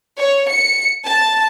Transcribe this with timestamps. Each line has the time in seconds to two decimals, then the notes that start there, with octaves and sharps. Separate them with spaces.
0.17 C#5
0.49 C#7
1.04 A5